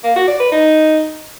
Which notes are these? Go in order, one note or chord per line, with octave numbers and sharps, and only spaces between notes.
A#3
F#4
D5
B4
D#4